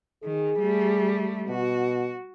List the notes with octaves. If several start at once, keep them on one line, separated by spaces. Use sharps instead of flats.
D#3 G#4
G3 A3
B2 F#4